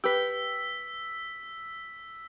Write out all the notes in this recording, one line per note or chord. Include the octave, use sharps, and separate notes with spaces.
G4 B4 E6 B6